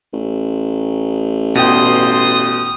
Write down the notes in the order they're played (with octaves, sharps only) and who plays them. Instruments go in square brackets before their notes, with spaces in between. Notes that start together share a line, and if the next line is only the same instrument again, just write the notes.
[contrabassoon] A1
[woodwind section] G2 C6 [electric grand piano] B2 G5 [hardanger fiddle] D#6